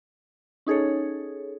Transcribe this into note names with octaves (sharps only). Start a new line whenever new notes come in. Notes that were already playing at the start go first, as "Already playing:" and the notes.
C#4 D#4 G#4 A4 C#5